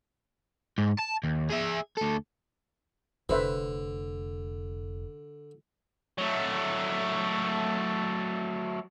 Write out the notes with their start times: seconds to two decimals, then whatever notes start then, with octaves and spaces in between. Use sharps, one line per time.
0.78 G#2
0.98 A5
1.24 D#2
1.50 G#4 E5
1.97 D2 A4
3.29 F1 D3 B4 C5 E5
6.18 F#3 A3